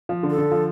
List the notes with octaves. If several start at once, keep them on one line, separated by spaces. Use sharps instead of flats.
F3
D3
A4
D3
F3